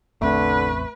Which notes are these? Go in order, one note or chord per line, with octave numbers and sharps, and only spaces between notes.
A1 E2 D3 A3 C4 B4